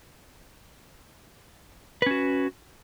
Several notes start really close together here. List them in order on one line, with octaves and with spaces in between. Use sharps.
B4 C#4 F#4